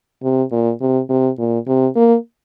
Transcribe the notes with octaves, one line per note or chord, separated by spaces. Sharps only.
C3
A#2
C3
C3
A#2
C3
A#3